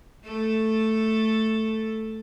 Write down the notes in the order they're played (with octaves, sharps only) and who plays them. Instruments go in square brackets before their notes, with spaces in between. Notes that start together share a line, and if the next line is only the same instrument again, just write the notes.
[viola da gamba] A3 A4